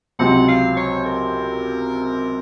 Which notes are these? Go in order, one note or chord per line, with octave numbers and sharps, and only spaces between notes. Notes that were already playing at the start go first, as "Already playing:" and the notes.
C#2 C3 F#3 C4 F#5
F5
C#5
A#4